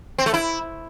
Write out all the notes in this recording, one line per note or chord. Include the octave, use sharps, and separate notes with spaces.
C4
A3
E4